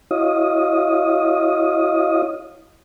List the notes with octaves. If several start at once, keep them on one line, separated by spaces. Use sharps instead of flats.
E4 F#4 C#5 D#5 F5 D#6